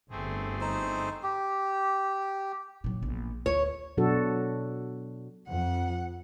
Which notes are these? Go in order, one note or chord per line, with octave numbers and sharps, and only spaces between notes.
G1 A3 C4 G#4
D#4 C5
G4
A#2 F#3
A#1 B3
D2 C#5
B2 F#3 D4 F#4 A4
F2 F#5